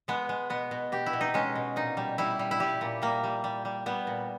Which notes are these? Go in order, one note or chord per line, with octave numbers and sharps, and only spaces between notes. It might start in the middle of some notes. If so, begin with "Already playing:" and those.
G#3 B3
G#3
B2 B3
B2
B2 G4
E4
B2
D#4
G#3 C#4
B2
A#2 D#4
G3
G3 E4
G3
E4
G3 G4
A#2
G3 A#3
G3
G3
G3
G3 B3
A#2